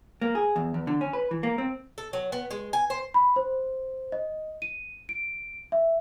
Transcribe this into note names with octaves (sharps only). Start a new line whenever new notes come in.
A#3
G#4
E2
E2
D3
C#4
B4
E3
A#3
C4
A4
F#3
B3
G#3
G#5
C5
B5
C5
D#5
D#7
D7
E5